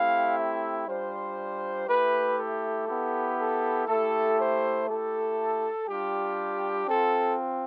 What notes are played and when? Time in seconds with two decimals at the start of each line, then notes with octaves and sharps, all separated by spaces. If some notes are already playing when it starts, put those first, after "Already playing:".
Already playing: A3 C4 E4 G4 F5
0.37 E5
0.87 G3 D4 F4 C5
1.88 A3 E4 G4 B4
2.37 A4
2.88 B3 E4 G4
3.38 A4
3.88 A3 E4 G4 A4
4.38 C5
4.88 A3 E4 G4 A4
5.88 G3 D4 F4 G4
6.88 C4 F4 A4